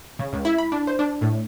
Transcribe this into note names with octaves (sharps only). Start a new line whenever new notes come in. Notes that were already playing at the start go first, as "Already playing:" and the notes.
C#3
C#2
E4
B5
D4
C5
D4
A2